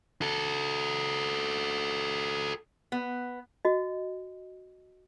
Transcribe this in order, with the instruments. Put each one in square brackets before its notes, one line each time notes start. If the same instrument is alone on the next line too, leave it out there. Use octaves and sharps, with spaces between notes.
[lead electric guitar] F#4 A4
[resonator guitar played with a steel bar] B3
[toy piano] F#4 D#5